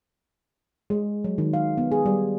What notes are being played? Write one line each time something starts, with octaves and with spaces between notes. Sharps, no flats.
G#3
F#3
D#3
F5
B3
G#4
G3